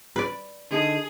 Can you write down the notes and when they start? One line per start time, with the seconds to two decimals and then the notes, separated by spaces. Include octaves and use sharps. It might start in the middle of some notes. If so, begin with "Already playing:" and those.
0.16 B4 D5
0.71 D3 D#4 G#4 A4